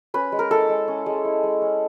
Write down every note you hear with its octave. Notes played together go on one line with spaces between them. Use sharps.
C#4 B4
G#3
A#4
E4 A4
G#3
C#4
G#3
E4
G#3
C#4